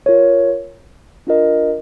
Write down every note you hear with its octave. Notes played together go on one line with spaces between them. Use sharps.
F4 A#4 C#5
D4 F4 A#4 D#5